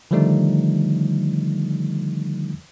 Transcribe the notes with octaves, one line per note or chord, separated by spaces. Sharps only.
D3 D#3 F3 G3 A3 D#4